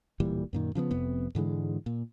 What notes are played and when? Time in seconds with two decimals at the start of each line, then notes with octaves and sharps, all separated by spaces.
0.20 D1 A#2 E3 G3
0.53 F#2 A#2 D#3
0.75 C#3 F3 G#3 B3
0.91 F1 F2 C3 B3
1.35 G#2 D3 E3 G#3
1.86 A#2